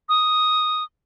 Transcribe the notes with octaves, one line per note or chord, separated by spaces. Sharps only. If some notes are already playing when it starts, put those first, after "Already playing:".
D#6